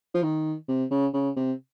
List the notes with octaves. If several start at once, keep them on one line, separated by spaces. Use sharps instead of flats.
F3
D#3
C3
C#3
C#3
C3